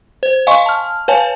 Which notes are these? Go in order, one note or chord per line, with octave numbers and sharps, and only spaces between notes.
C5
D#5 F5 G#5 C6 C#6
A5 F6
B4 C#5 F5 G#5 A5